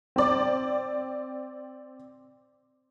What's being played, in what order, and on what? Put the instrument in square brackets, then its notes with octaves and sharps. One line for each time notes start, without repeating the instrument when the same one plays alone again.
[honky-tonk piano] C4 D5